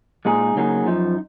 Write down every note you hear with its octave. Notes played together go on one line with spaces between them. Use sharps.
A#2 G#3 D#4 G#4
C#3 F#3 A#3 D#4 G#4
F#2 F3 D#4